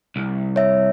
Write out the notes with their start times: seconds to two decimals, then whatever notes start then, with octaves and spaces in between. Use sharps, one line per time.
0.16 C2
0.56 C#5 E5